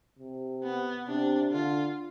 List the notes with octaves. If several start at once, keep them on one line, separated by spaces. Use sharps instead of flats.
C3
B3
C3 D4
D3 F4